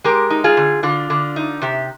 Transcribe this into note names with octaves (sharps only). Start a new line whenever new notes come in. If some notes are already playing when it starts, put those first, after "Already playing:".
G#3 G4 A#4
D#4
F4 G#4
D3
D3 F4
D3
D#4
C3 G4